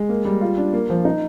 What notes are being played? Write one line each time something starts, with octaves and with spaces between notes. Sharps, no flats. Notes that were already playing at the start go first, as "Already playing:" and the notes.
Already playing: G#3
A#3
G3
F4
D4
A#3
F3
D#4